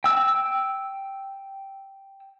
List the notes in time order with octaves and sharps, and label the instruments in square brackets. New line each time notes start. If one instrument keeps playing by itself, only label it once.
[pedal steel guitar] G5 E6